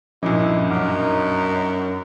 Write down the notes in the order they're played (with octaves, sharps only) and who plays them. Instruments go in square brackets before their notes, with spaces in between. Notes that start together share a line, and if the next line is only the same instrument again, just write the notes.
[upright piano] B1 G2 A#2 [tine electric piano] F3 C#4 D#5 [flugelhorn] E4
[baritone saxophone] F#2 [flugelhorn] D#4 [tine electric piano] F#5 D6 F6